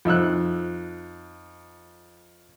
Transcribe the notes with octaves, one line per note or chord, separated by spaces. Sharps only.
F2 D#4 E6 F#6